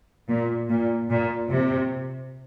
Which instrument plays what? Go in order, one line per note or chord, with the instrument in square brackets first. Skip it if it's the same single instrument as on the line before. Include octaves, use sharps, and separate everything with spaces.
[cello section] A#2
A#2
A#2
C3